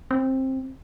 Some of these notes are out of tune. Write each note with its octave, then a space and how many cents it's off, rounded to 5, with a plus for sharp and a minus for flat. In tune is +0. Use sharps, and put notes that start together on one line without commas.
C4 +15